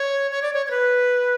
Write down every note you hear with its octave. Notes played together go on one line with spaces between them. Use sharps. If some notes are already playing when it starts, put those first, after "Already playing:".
Already playing: C#5
C#5
D5
C#5
C#5
B4